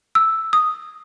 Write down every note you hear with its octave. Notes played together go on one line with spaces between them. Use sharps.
E6
D#6